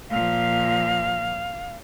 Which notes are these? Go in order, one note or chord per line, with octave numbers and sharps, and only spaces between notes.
A#2 F3 F5